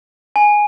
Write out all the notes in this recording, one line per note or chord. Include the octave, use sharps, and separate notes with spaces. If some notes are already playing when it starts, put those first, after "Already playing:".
G#5